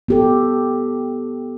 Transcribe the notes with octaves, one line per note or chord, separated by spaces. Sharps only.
B3 G4 A4